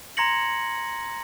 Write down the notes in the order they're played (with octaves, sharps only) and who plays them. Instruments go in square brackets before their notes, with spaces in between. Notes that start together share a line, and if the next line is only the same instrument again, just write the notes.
[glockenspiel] A#5 C6 G#6 A#6 C#7 F#7